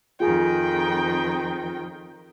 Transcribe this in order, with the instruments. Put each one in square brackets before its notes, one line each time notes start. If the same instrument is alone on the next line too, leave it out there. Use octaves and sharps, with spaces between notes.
[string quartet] F2 D#3 G5 [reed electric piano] F4 G#4 G#5